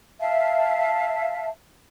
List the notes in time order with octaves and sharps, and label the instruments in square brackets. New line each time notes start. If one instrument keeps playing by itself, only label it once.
[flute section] E5 F5 A5